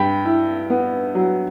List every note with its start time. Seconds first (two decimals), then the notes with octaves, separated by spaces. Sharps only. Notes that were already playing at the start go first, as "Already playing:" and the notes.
Already playing: G2 G5 B5
0.25 E4
0.70 B3
1.15 F#3